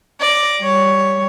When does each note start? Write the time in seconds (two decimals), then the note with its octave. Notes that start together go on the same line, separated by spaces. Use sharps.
0.20 D5 A#6
0.62 G3 C#5